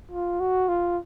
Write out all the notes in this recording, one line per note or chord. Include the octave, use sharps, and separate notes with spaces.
F4
F#4
F4